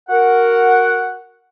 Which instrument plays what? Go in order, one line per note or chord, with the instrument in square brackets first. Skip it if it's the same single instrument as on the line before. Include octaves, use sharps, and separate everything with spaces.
[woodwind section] F#4 A#4 F#5